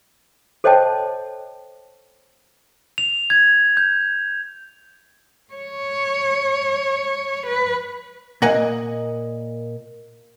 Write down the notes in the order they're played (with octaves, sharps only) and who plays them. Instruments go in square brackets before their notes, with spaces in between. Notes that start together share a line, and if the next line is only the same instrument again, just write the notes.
[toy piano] A4 C5 C#5 D#5 G5 A5
[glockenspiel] F7
G#6
G6
[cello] C#5
B4
[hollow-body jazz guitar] A#2 A#3 D#5 [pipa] A#4 F#5 G#5